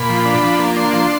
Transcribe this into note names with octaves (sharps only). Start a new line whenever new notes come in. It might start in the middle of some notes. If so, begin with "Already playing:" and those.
Already playing: A#2 B5
F3
D4
F3
A#3
D4 C6
F3